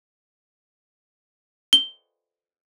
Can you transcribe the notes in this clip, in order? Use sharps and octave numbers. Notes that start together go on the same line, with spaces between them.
G7